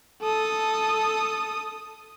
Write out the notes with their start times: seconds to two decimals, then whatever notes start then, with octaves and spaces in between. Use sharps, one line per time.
0.22 A4 D#6